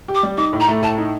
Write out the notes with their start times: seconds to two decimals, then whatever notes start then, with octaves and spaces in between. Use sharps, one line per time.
0.08 G4
0.15 D6
0.23 G3
0.37 D#4 D6
0.53 A2
0.60 A#5
0.68 A3
0.82 A2 A5
0.98 D#4